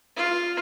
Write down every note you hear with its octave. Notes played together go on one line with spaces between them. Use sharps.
F4